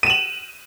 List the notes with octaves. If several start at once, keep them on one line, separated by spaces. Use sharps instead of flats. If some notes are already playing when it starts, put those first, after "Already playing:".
D#7 E7 F#7